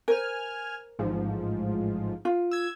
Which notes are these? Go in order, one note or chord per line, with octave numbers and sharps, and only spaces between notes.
A#4 C5 G#5 F6
A1 G#2 F3
F4
E6 G#6